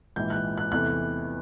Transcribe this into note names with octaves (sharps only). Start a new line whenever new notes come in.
A#1 G#2 E3 G6
F#6
F#6
E2 C3 E3 A3 F#6